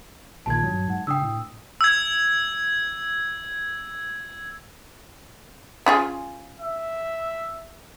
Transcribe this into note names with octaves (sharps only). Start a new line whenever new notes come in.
A#1 A#2 D#3 A5 G#6
G2 F#3
G#2 F#5
C#3 D4 G5 D#6 E6
A2
E6 G#6
C#4 F4 G#4
E5